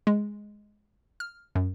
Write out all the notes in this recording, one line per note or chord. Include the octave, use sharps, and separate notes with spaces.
G#3
F6
F#2